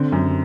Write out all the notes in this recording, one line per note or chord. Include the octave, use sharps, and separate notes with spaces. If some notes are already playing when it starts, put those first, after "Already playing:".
Already playing: D3 C4
F#2